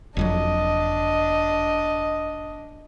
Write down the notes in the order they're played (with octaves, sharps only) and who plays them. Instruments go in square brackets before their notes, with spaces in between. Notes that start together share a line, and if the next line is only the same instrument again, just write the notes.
[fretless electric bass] F#1 F2 F#3 [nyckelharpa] D4 D#5